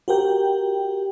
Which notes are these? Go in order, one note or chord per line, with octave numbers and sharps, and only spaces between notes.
F#4 G4 A#4 G5